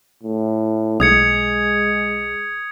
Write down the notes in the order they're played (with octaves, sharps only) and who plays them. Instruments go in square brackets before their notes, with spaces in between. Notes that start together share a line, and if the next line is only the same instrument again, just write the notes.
[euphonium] A2
[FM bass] B1 [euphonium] G#3 [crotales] D#6 G#6 C#7